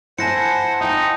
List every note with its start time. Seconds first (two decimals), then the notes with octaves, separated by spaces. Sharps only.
0.19 E4 C5 E5 F#5 G#5 A5 A#6 C#7
0.81 D#4 F4 E5 G5